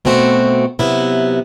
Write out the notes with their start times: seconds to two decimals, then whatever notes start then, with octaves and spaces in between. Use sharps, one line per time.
0.05 B2 A3 C4 F#4
0.79 C3 F#3 B3 E4